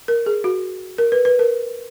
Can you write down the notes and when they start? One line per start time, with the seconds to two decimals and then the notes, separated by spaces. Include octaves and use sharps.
0.08 A#4
0.26 G#4
0.44 F#4
0.98 A#4
1.12 B4
1.25 B4
1.39 A#4